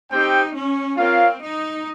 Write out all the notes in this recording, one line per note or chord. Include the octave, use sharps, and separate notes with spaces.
C4 D#4 G4 C5 G5
C#4
C4 F4 A#4 C#5 F5
D#4